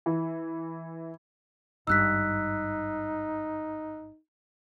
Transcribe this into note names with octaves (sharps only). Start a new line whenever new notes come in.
E3
G#1 G2 D#4 E6 F#6 B6